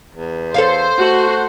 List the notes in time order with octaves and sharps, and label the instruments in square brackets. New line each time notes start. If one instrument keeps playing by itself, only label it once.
[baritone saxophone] E2
[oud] A4 C#5 F5 [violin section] C5
[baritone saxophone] A3 [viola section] F#4